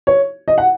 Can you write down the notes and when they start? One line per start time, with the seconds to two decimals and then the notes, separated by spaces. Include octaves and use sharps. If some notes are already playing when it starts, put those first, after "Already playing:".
0.07 C#5
0.48 D#5
0.58 F#5